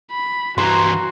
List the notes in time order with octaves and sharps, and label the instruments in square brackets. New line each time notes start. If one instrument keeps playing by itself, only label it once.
[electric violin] B5
[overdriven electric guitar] G2 E3 [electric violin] F#4 [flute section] A#5 [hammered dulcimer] C6